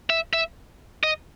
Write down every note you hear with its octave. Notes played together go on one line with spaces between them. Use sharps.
E5
E5
D#5